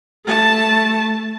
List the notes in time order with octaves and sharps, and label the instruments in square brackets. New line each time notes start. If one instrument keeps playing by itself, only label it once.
[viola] A3 A5